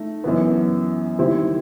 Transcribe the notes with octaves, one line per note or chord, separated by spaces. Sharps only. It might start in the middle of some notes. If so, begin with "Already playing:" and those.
Already playing: A3 D#4
F#2 E3 B3
D#3 G3 C4 E4